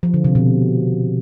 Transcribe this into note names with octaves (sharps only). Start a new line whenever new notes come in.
F3
D3
C3
B2